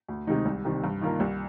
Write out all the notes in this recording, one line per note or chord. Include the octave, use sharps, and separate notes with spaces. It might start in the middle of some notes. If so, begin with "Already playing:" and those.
D2
C3 D#3 G#3 D#4
C2
C3 D#3 G3
G2
D#3 A#3 F4 A#4
C2